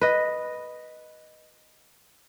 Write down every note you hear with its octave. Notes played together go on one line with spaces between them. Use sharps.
B4 D#5